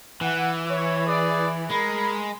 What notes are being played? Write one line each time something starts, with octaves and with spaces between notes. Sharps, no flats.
E3 F#5
E4 C#5
G#4 B4 D5
G#3 A#4 B5